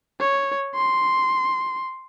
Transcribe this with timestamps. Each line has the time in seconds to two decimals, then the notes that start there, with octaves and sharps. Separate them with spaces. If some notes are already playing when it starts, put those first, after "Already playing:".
0.20 C#5
0.75 C6